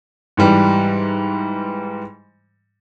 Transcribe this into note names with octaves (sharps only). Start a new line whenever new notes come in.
G#2 E3 G3